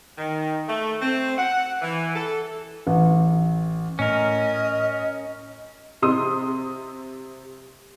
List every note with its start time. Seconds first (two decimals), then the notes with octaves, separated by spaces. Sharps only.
0.18 D#3
0.68 A3
1.02 C4
1.38 F#5
1.82 E3
2.15 A4
2.87 A1
3.99 A2 C#4 A#4 D#5
6.02 C3 C6 D#6